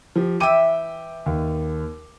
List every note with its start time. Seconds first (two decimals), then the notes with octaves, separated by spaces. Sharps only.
0.16 F3 G4
0.40 E3 E5 G5 D6 D#7
1.26 D#2